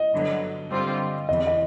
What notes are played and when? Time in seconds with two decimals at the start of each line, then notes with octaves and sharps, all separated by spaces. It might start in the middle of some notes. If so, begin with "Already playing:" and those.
Already playing: D#5
0.12 G2 D3 F#3 B3
0.70 G2 D3 G3 C4 F4
1.28 E2 C3 E3 D#5
1.47 D#5